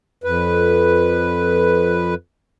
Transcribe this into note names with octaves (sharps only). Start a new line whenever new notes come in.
F2 B4